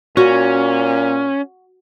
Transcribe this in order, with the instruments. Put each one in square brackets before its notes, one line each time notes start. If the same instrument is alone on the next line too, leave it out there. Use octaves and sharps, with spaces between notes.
[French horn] A#2 [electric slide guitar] C#4 [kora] F#4